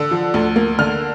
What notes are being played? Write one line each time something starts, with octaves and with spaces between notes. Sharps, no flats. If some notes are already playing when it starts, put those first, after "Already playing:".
Already playing: D3 E6
F3
D2
A#3
D3 F6